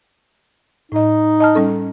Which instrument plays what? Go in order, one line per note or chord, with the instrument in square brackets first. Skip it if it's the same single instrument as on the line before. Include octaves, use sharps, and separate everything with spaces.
[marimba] A2 D#5 [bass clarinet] D#4
[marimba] D#5 A5 F6
G3 C#4 A4